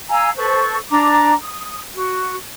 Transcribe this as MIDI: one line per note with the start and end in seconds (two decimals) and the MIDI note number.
0.09 0.30 77
0.09 0.30 80
0.09 0.30 82
0.09 0.30 88
0.37 0.77 69
0.37 0.77 71
0.37 0.77 72
0.37 0.77 85
0.90 1.34 62
0.90 1.34 82
0.90 1.34 86
1.43 1.79 87
1.95 2.36 66